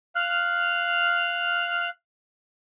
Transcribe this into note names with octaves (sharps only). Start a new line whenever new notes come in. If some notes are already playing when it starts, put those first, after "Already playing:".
F5 F6 F#6